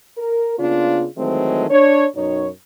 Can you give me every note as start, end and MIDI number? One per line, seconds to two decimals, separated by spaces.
0.18 0.54 70
0.58 1.05 49
0.58 1.05 58
0.58 1.05 59
0.58 1.05 62
0.58 1.05 65
1.17 1.66 51
1.17 1.66 52
1.17 1.66 54
1.17 1.66 56
1.17 1.66 57
1.17 1.66 60
1.70 2.05 62
1.70 2.05 73
2.15 2.47 42
2.15 2.47 47
2.15 2.47 63
2.15 2.47 73